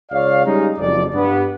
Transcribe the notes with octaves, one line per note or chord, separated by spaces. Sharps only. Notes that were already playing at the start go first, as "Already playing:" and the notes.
C#2 C#5 D5 F5
G3 G#3 C#4 D#4
F#1 F2 D5
G2 B3